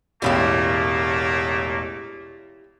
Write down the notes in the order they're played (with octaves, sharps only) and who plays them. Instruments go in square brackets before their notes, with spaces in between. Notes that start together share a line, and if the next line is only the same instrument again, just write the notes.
[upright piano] E1 A1 [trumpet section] A3 A#3 [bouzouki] E4 G4 F5